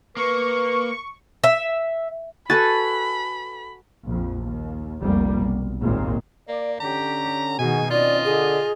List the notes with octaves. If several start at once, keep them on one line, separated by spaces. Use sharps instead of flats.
A#3 B4 C#6
E5
F#4 A4 B4 G#5 B5 A6
A#1 F2
D#2
F1 C2 G3 A#3
B1
G#1 D#2 A#2 G#3
A#3 D5
D3 C#4 G4 A#5
B2 D#3 F#4 G#4 D#5 G#5
D#3 C4 C#4 F4 D5 D#5
D3 G#4